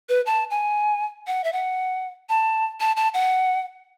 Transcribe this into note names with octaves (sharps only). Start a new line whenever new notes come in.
B4
A5
G#5
F#5
E5
F#5
A5
A5
A5
F#5